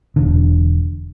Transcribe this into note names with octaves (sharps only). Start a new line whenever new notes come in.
E1 D3